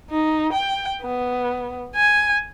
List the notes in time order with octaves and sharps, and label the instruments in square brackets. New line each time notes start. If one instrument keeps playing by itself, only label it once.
[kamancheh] D#4
G5
B3
G#5